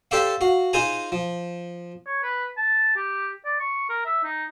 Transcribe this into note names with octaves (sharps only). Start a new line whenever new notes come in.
G4 A4 C5 D5 E5 F5
F#4 F5
D#4 F4 G#4 C5 G#5 A#5
F3
C#5
B4
A5
G4
D5
C#6
A#4
E5
D#4